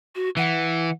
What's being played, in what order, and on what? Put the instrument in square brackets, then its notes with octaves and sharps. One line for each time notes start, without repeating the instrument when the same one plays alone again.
[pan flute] F#4
[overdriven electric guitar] E3 [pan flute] F#5